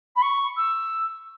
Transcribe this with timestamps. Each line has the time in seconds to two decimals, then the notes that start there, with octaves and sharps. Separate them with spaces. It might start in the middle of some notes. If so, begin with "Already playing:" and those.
0.16 B5
0.22 C#6
0.56 E6